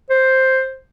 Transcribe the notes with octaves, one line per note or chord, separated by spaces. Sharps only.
C5